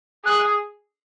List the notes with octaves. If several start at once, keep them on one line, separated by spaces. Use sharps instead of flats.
G#4 F#6